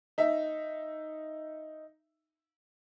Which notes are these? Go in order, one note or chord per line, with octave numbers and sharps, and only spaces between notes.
D#4 E5